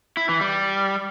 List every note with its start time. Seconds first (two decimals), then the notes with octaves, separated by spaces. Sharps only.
0.17 E4
0.29 E3
0.41 G3